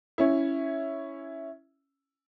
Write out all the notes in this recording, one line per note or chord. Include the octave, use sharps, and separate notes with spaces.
C#4 E4